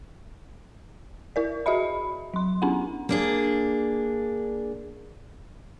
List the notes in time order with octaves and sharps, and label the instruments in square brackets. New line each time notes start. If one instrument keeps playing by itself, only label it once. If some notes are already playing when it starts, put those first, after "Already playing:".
[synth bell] E4 A#4 D5
F#4 G#4 D#5 E5 B5
F#3 C6
B3 C#4 D4 E4 F#5
[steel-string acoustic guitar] A#3 D4 G#4